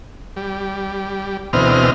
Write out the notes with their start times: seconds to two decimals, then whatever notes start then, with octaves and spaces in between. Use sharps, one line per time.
0.36 G3
1.53 D2 B2 E3 C4 D#5 F6